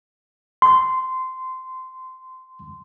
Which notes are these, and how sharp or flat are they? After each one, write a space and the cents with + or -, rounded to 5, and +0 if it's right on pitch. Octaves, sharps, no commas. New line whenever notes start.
C6 -15